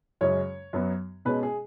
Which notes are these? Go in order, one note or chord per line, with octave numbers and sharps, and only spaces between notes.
F#2 C#3 G#3 C#4 C#5
F#2 F#3 B3
B2 G#3 C#4 B4
G#4